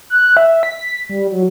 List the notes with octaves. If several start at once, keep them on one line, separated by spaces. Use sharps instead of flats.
F#6
E5
B6
G3
F#3